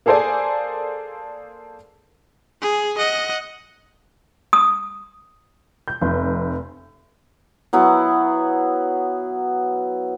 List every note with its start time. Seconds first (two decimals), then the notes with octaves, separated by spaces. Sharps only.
0.06 A#3 G#4 A4 C5 D5 G#5
2.61 G#4
2.98 D#5 F#5
4.53 D#6
5.88 G6
6.01 F1
7.73 F#3 B3 E4